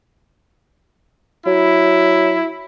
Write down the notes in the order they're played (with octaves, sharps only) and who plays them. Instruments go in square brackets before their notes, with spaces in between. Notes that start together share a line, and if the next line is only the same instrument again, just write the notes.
[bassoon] F#3 [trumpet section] E4